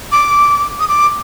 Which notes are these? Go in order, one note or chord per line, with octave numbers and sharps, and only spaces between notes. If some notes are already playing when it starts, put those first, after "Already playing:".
D6
D#6
D6